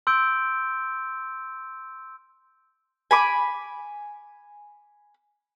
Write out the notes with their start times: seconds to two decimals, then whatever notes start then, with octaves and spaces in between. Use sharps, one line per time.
0.07 C6 E6 G6 D7 G7
3.11 G#5 B5 D6